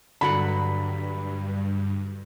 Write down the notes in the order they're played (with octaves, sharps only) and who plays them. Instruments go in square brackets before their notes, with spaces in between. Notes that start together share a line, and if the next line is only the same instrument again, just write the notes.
[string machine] G2 [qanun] D3 F#3 F#5 [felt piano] B5